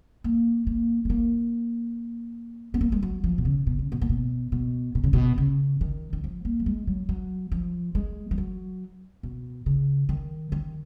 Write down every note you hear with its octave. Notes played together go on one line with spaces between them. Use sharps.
A#3
A#3
G#3
A#3
B3
A#3
G#3
F#3
F3
B2
C#3
B2
C#3
B2
A#2
B2
B2
B2
C#3
B2
C#3
D#3
D#3
F3
A#3
F#3
G#3
F#3
F#3
F3
G#3
F3
F#3
B2
C#3
D#3
D#3